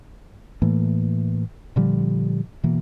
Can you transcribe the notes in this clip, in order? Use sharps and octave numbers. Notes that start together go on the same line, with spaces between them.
A2 E3 A3 A#3
A#2 D3 F3 G3
B2 E3 A#3